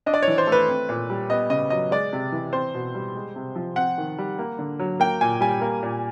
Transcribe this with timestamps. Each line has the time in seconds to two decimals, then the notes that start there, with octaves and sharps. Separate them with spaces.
0.06 D4 D#5
0.14 D5
0.22 C#5
0.28 E3
0.38 C5
0.47 A3
0.52 B4
0.69 C4
0.89 A#2
1.10 G3
1.30 B3 D#5
1.50 C#3 D#5
1.70 F#3 D#5
1.91 G#3 D5
2.13 C3
2.32 E3
2.53 C4 C5
2.74 B2
2.95 G3
3.15 G#3
3.36 C3
3.56 F3
3.76 C4 F#5
3.98 D#3
4.18 G3
4.39 A#3
4.59 D3
4.79 F#3
5.00 A#3 G5
5.21 A#2 G#5
5.41 G3 G#5
5.61 A#3
5.83 A#2